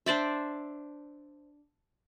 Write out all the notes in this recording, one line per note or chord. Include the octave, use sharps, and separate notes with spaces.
D4 C5 D5 E5